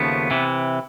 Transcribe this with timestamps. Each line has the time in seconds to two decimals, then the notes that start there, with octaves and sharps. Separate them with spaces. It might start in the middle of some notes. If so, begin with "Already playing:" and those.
Already playing: D#2 C#3 F3 A3 B3
0.31 C3 E3